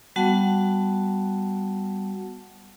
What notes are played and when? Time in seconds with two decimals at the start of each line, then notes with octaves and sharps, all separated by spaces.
0.16 G3 B3 F#4 F#5 A5